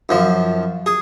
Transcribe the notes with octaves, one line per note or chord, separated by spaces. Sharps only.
F#2 F3
G#4